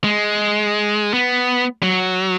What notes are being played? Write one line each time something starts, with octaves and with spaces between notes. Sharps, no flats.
G#3
B3
F#3